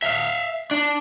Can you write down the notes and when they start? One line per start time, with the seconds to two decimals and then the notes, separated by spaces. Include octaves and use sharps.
0.02 E5 F5
0.71 D4